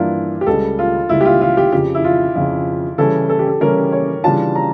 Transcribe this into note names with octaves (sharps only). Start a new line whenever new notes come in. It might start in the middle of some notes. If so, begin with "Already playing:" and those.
Already playing: G2 E3 A#3 D4 E4 F4
G4
C#2 C#3 G3 A4
F4
C#2 C#3 G3 E4
G4
F4
F4
G4
F2 C#3 F3 G4
E4
F4
F2 C#3 F3 F4
C#3 E3 G3 C#4 E4 A4
A4
G4
A4
C#3 E3 G3 C#4 E4 A#4
C#5
C#3 E3 G3 D4 F4 A5
A#5